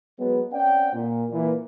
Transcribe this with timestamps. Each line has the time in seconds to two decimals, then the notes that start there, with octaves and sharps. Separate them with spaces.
0.19 F#3 G#3 B3
0.53 C4 C#4 D5 F#5 G5
0.93 A#2
1.31 A#2 E3